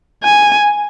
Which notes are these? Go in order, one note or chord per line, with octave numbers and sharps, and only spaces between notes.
G#5